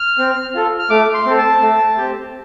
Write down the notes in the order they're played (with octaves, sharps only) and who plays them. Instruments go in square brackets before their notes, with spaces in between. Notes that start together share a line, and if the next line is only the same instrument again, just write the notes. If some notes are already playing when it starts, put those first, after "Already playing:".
Already playing: [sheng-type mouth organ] F6
C4
F4 A4
F6
A3 D6
C6
C4 A4
A5
A3
C4 G4